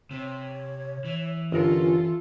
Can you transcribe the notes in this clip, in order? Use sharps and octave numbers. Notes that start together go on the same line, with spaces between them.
C3 C#5
E3
G1 C#4 F4 A4 A#4